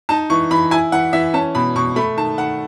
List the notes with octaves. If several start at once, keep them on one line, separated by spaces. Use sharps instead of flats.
D#4 A5
E3 C#6
E3 B5
E4 G#5
E3 F#5
E3 E5
C#4 A5
B2 B5
B2 C#6
A3 B5
D#3 A5
D#3 F#5